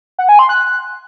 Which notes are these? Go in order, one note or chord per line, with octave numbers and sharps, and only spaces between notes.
F#5
G#5
C6
F#6